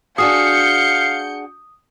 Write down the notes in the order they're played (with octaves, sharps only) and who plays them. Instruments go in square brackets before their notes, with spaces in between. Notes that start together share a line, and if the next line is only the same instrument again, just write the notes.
[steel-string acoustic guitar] D4 F#4 G#4 [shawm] F5 [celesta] D#6 [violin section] G6 C#7